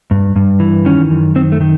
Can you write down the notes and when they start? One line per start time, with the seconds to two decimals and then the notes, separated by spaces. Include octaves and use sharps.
0.11 G2
0.36 G2
0.60 E3
0.85 D#3 C#4
1.11 F#2
1.35 D#3 C4
1.52 A3
1.61 D#3